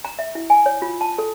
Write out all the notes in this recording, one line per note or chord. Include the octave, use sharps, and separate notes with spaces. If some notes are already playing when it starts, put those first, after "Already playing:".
A#5
E5
E4
G#5
C#5
F4
A5
A4